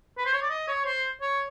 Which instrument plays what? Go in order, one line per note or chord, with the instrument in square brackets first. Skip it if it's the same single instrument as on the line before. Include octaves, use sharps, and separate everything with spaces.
[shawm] B4
C5
C#5
D5
D#5
C#5
C5
C#5